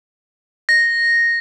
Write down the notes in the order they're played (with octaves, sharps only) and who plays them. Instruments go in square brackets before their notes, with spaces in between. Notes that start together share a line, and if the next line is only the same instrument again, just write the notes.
[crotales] A#6